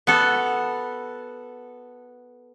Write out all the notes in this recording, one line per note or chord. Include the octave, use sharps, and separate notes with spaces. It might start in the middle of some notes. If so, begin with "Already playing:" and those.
B3 F#4 A4